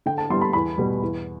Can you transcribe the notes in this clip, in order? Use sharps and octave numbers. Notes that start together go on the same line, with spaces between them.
D3 G5
A5
G3 B3 E4 C6
B5
E2 B5
B2 G3
E2